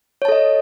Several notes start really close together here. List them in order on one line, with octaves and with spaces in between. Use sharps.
C#5 A5 A4 D#5